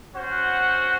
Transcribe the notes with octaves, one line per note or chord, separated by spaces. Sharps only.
C#4 F#4 C5 F#5